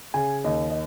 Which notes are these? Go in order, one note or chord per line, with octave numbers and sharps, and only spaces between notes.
C#3 G#5
D#2 D#5
D#5